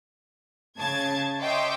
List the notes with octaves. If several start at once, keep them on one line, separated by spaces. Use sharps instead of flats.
C#3 A5 G#6
C#5 D#5 E5 G5 C6 D6